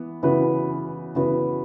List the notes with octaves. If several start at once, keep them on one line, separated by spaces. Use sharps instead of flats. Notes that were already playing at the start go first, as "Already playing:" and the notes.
Already playing: E3 B3
C#3 E3 B3 F#4 B4
C#3 E3 B3 F#4 B4